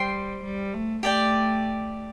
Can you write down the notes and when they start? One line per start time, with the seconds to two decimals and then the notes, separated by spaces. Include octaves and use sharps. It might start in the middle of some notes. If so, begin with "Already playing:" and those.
Already playing: G3 C5 G5 C6
0.44 G3
0.74 A3
1.03 A3 G4 D5 G5